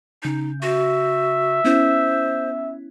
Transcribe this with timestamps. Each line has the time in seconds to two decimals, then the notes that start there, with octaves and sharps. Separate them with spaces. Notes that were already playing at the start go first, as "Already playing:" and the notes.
0.23 C#3 D#4 G6
0.62 F#4 E5
1.64 B3 C#4 E4 C5